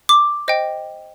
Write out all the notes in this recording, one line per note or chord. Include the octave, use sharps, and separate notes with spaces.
D6
C5 D#5 G5